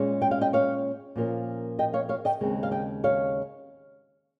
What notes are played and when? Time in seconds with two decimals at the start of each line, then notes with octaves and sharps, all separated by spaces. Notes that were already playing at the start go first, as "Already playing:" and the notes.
Already playing: A#2 G#3 C#4
0.22 G5
0.31 F5
0.41 D#5 G5
0.53 C#5 F5
1.16 A#2 F3 A#3 C#4
1.79 D#5 G5
1.93 C#5 F5
2.09 C#5 F5
2.25 D#5 G5
2.41 D#2 C#3 G#3 C4
2.63 F5
2.71 D#5 G5
3.04 C#5 F5